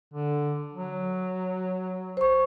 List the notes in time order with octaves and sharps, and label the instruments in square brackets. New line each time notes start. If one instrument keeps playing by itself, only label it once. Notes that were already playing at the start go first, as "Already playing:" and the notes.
[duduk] D3
F#3
[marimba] C5 C#6